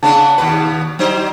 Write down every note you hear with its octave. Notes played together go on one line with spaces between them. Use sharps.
C#3 B3 D4 D#4 G#4
D#2 B2 B4
F#3 D#4 C5